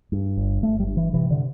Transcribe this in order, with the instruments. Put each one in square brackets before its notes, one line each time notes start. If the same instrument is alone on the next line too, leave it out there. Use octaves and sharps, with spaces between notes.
[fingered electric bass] G2
G1
G1 A3
G3
G2
E3
C3 E3
D3